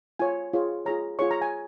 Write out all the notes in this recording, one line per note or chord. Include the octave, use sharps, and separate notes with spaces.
F4 C#5 G#5
F4 G#4 C#5
F4 G#4 C#5 A#5
F4 G#4 C#5 C#6
A#5
G#5